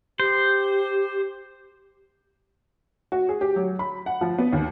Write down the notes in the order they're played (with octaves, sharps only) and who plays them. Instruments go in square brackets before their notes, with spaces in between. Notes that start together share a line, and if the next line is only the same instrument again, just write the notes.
[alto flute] G4 [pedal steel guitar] C5
[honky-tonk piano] F#4
G#4
G4
F#3
B5
F#5
F3
B3
D#2